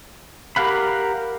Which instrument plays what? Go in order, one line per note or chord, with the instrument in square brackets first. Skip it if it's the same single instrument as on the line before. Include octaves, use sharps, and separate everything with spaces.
[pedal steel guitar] G4 A#4 F5 F#5 B5